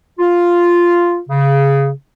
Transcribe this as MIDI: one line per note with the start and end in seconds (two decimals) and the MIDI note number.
0.19 1.18 65
1.30 1.90 49